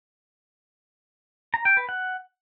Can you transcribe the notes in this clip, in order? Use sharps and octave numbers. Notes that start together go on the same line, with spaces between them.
A#5
G5
B4
F#5